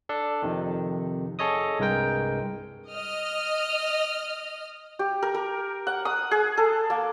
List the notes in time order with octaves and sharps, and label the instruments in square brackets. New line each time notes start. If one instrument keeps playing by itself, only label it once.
[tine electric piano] D4 A4
F2 C3 D#3
G#4 A4 C#5 D#5 D#6
C2 G2 G#3 A#4 G5
[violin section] D#5 F6
[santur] G4
A#4
A#4
F#5
D#6
G#4
A4
A#3